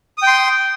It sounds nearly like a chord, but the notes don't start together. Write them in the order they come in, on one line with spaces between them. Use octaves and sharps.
D#6 G5 C6